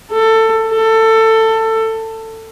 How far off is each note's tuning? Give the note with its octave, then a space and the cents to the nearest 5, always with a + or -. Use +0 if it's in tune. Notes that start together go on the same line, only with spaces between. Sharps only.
A4 +20
A4 +20